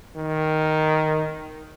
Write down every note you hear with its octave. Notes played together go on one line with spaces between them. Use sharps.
D#3